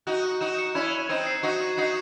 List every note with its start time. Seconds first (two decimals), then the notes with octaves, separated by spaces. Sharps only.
0.07 D#4 F#4 F#6
0.24 F#6
0.41 D#4 F#4 E7
0.58 C#7
0.74 C#4 E4 G#6
0.92 F#7
1.09 C4 D#4 D#7
1.27 C7
1.43 D#4 F#4 C#6
1.60 C#6
1.77 D#4 F#4 C7